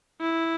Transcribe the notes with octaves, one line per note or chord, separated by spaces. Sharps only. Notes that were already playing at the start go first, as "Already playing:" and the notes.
E4